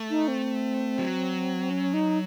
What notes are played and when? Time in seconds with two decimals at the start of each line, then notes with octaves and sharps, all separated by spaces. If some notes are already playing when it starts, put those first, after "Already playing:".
Already playing: A3
0.10 D#4
0.28 C4
0.99 F#3
1.70 C#4
1.94 D#4